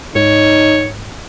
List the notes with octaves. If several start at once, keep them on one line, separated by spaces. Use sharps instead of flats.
G#2 D#4 C#5